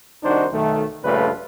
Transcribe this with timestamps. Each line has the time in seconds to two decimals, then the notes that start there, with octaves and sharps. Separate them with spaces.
0.24 C2 D#3 D4 D#4 F#4 C5
0.53 B1 D#3 A3
1.04 A#1 G2 C#3 A3 F4 B4